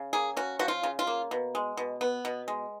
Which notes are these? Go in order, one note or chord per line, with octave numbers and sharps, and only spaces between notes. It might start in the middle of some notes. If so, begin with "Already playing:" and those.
Already playing: C#3
A#3 G#4
C#4 F#4
F3 F#4
F4
C#3
F4
A#3
B2
G#3
B2
B3
B2
G#3